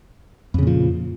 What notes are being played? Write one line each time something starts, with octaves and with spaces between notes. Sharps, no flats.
F2 A#2 C#3 F3